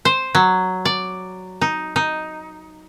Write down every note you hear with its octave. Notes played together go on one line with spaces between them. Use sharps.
C5
F#3
D5
D#4
D#4